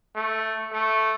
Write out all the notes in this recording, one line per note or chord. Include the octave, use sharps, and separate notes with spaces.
A3
A3